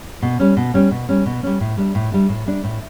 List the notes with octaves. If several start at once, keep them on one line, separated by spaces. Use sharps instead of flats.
B2
G3 C#4
B2
G3 C#4
B2
G3 C#4
B2
G3 C#4
A2
G3 D4
A2
G3 D4
A2
G3 D4
A2